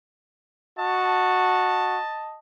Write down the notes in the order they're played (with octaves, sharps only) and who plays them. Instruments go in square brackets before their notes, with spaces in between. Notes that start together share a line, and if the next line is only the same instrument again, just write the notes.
[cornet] F#4 [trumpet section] D#5 A5